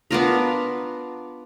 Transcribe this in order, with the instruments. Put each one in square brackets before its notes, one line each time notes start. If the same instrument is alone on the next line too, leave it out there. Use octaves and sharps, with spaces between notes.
[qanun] B3 D4 F4 A#4